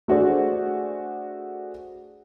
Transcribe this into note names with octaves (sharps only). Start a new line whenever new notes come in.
A3 D4 F#4 G#4 C5 D5